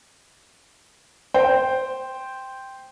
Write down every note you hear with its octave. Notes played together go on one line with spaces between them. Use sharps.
C5 G5